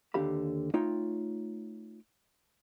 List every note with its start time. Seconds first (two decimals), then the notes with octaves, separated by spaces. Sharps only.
0.14 D#2 D3 G4 F5 B5
0.74 A3 D#4 F4 C#5 G5